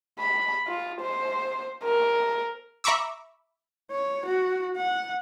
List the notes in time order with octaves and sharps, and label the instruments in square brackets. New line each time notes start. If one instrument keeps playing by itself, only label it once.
[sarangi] B5
F4
C5
A#4
[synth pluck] E5 A#5 B5 C#6 D6 E6
[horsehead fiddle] C#5
F#4
F#5